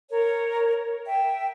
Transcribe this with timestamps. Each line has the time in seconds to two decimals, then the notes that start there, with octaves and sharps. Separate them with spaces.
0.09 A#4 C#5
1.05 E5 G5